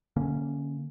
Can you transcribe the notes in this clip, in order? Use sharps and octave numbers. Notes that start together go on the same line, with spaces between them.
D3 A#3 C#4